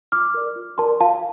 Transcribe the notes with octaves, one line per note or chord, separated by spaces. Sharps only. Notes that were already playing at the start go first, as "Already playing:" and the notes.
F4 D6 F6
A#4 D5
F4
A#4 D5 A5 C6
F4 F5 A5